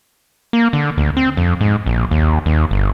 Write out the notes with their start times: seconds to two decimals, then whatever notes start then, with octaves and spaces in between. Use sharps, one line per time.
0.53 A#3
0.73 D3
0.98 D2
1.17 C4
1.37 F2
1.61 G#2
1.86 A#1
2.11 D#2
2.46 D#2
2.71 G1